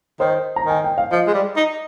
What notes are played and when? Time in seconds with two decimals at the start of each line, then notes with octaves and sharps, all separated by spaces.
0.20 D#3 C5
0.56 A#5
0.66 D#3 G#5
0.84 G5
0.98 F5
1.11 F3 D#5
1.27 G#3
1.34 G3
1.56 D#4